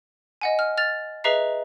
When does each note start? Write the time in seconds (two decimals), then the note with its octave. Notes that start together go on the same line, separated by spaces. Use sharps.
0.41 D#5 F#5 G#5
0.59 F6
0.77 F6 A6 F7
1.24 G#4 B4 D#5 E5 A#5 C7